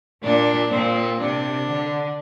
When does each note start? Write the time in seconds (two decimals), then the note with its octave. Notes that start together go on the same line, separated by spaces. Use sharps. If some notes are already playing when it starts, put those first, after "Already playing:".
0.23 A#2 D4
0.71 A#2 C4
1.19 C3 D4
1.67 D3